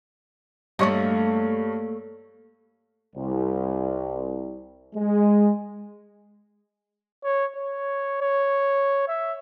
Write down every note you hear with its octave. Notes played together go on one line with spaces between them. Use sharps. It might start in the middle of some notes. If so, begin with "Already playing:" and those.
G2 A3 A#3 C#5 D#5 C#6
C2
G#3
C#5
C#5
C#5
E5